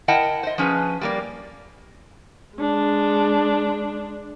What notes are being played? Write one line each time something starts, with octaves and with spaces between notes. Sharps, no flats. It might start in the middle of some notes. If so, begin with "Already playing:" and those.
E4 A#4 D#5 F#5 G5 A5
C5 D#5
F3 C#4 G#4 B4
G3 A#3 D5
G#3 D4